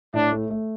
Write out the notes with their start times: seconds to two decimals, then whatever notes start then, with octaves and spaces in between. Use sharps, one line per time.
0.14 A2 D4
0.32 A3
0.50 A3